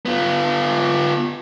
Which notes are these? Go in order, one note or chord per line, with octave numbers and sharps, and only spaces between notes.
B3 F4